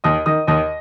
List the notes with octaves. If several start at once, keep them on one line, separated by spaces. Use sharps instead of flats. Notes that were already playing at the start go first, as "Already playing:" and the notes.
D#2 D#5 D#6
D#3 D#5 D#6
D#2 D#5 D#6